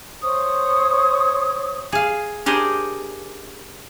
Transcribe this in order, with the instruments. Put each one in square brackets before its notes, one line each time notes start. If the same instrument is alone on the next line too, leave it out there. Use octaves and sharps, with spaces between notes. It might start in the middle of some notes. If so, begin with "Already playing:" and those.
[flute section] C5 C#5 C#6 D#6
[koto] G#4 F5
D4 G4 G#4 A#4 C5